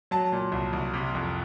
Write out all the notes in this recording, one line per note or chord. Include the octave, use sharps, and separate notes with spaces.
F#3 A5
A#2
C2
C2
C3
F2